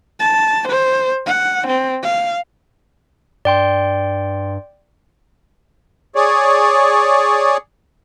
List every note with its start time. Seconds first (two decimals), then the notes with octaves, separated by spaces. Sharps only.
0.20 A5
0.68 C5
1.26 F#5
1.67 C4
2.02 F5
3.45 G2 D5 G5 C6
6.16 G#4 C#5 D5